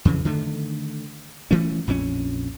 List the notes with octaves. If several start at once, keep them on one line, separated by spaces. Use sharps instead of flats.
F2 C#3 E3
D3 D#3 A3
E3 A3 C#4
A#1 F2 F3 C#4